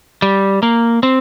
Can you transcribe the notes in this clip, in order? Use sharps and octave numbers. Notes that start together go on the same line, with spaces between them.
G3
A#3
C4